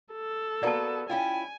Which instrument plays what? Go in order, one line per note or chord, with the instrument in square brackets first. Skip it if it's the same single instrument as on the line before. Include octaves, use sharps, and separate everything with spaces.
[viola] A4
[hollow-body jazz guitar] A#3 B3 F#4 [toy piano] D5 A5
[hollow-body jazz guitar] C#4 E4 F4 [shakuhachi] G5 [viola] G#5